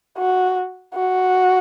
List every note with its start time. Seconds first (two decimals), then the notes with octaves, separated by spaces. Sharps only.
0.18 F#4
0.95 F#4